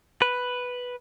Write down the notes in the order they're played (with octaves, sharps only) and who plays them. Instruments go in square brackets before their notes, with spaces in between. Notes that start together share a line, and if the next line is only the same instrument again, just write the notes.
[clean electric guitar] B4